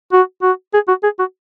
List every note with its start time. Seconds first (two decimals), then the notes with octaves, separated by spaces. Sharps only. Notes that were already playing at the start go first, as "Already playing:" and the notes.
0.13 F#4
0.42 F#4
0.74 G#4
0.88 F#4
1.03 G#4
1.19 F#4